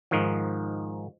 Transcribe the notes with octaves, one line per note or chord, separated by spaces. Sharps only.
G#2 D#3 F3